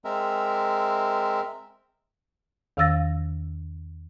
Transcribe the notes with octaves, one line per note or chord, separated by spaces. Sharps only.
G#3 C4 A#4 E5
E2 D#3 F5 E6 A6 A#6